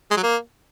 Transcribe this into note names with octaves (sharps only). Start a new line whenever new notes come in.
G#3
F#3
A#3